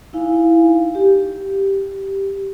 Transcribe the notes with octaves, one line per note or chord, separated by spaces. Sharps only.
D#4 E4 F5 G#5
G4